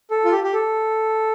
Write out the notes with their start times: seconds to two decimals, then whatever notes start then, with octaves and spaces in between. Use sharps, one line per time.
0.11 A4
0.25 F4
0.32 G4
0.44 G4
0.54 A4